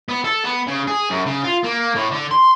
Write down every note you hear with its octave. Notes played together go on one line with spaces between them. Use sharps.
B3
A4
B3
C#3
G#4
F#2
C#3
F4
A#3
A2
D3
C6